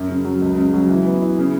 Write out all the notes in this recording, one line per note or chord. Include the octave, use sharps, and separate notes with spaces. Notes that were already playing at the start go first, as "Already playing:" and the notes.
Already playing: F#2
C#3
F#3
C#2
C#3
F#3
E3
B3
E4
C#3